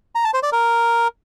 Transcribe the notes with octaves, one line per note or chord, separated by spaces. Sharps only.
A#5
A5
C5
D5
A#4